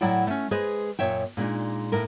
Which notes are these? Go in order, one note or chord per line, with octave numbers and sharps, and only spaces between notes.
A2 F#3 E4 D5 F#5 G5
A3 C#4
G#3 G#4 B4 C5 D#5
F#2 A#2 C#5 E5 G5
A#2 G#3 D4 D#4
A2 A#3 A#4